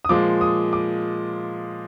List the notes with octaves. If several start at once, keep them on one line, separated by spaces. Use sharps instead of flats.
D#6
A#2 F3 G#3 D6
D#6
D6